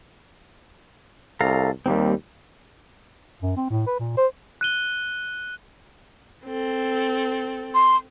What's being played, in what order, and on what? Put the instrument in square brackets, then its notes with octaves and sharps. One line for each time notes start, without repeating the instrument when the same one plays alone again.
[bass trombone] C2 [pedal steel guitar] A4 F5 A#5
[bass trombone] D#2 [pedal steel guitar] G3 A#3 C4
[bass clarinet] F#2
C4
A2
B4
A#2
C5
[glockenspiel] F#6 D#7 G7
[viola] C4 A4
[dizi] C6